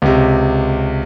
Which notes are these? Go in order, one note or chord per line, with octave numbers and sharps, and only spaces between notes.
C#2 C3